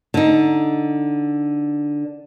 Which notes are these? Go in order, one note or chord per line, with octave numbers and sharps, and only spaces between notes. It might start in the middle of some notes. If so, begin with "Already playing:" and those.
D3 D#4